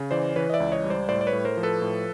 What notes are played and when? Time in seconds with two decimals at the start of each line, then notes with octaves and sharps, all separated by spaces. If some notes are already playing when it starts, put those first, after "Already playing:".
Already playing: C#3
0.11 E3 C5 D5
0.36 E3 B4 C#5
0.50 D#5
0.54 D5 E5
0.60 C#2
0.72 C#5 D#5
0.84 G3
0.90 C5 D5
1.09 A2 C5 D5
1.21 D5
1.27 B4 C#5
1.33 A2
1.45 A#4 C5
1.57 F3
1.63 A4 B4
1.82 A2